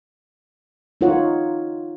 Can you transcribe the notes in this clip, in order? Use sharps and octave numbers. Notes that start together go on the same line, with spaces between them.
D#4 F4 A#4 C#5 F#5